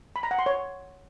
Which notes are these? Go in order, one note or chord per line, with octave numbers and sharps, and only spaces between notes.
B5
A#5
F#5
C6
C#5